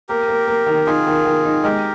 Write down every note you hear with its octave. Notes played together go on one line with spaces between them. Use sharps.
A#3 G4 A#4
A#3
A#3
D#3
D#4 F4 G#4
D#3
D#3
D#4
G#3 G4 A#4